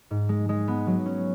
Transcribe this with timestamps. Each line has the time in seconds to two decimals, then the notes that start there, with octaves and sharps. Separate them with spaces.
0.11 G#2
0.29 G#3
0.49 G#3
0.68 B3
0.87 F#3
1.06 C#4